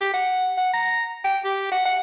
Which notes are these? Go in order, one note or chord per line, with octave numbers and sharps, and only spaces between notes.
G4
F#5
F#5
A#5
G5
G4
F#5
F#5